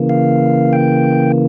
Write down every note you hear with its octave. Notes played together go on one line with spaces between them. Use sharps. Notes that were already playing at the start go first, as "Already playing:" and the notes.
Already playing: C#3 E3 A#3
F5
G5